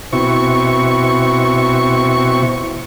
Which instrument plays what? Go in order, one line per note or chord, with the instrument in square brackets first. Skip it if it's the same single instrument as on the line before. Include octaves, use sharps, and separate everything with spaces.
[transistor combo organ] B2 C4 E4 C#6